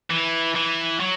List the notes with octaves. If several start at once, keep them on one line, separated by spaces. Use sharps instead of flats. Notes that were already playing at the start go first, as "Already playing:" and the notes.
E3
E3
F#3